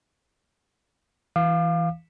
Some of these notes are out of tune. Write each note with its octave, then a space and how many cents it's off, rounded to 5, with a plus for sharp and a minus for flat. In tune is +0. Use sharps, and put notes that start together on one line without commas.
E3 +0 F5 +0 D6 +35